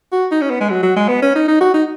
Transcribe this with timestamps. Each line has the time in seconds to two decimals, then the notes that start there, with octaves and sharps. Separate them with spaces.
0.12 F#4
0.31 D#4
0.41 C#4
0.50 B3
0.60 G#3
0.70 F#3
0.82 F#3
0.96 G#3
1.08 B3
1.22 C#4
1.35 D#4
1.48 D#4
1.61 F#4
1.74 D#4